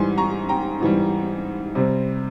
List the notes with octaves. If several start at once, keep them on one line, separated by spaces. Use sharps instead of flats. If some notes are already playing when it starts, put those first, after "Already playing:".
Already playing: G#2 E3 G3 G#5 C6
A#5 C#6
G5 A#5
G#2 E3 G3
C3 G3 C4